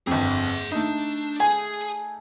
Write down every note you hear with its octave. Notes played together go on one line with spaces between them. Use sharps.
G1 F2 G#4 F#5
A3 D4 D#4
G#4 G#5